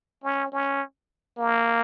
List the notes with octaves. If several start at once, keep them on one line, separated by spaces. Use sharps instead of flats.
C#4
C#4
A#3